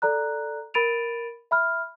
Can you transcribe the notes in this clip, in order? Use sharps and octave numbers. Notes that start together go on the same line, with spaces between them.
A4 D5 A#5 F#6
A#4 B5 A6 D7 D#7 F7
E5 B5 F6